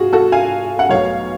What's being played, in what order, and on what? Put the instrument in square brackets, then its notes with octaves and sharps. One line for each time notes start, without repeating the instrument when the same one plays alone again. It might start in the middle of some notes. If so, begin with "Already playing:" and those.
Already playing: [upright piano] F4 F#4 G#4
F#4 A4
F5 G#5
F#5
B1 B2 F#3 A3 C#5 F5